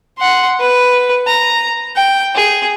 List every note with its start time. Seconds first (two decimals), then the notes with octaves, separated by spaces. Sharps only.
0.19 F#5 C6
0.59 B4
1.27 A#5
1.96 G5
2.35 G#4